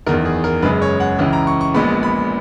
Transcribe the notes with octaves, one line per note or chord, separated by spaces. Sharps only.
F#1 E2 D#3 A#4
G#4
A#4
F#1 F#2 C#3 G#3 B4
C#5
F#5
C#2 C#3 E3
A#5
C#6
C#6
A#1 A#2 G#3 B3 B5
B5